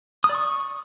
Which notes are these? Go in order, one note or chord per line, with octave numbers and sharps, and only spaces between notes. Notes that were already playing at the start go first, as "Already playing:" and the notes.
D#6
D5
C#6